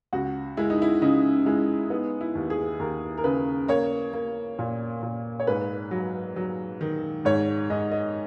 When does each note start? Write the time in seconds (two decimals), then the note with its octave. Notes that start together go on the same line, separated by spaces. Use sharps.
0.13 C#2 F#4
0.57 G#3 E4
0.70 D#4
0.82 E4
1.02 C#3 D#4
1.46 G#3 E4
1.90 B3 D#4
2.21 E4
2.35 D#2
2.50 G#4
2.79 D#2 A#4
3.17 A#4
3.24 C#3 B4
3.68 A#3 C#5
4.13 A#3
4.59 A#2
5.02 A#2
5.40 C#5
5.47 G#2 B4
5.91 F#3
6.36 F#3
6.81 D#3
7.25 G#2 C#5
7.70 G#2 D#5
7.92 D#5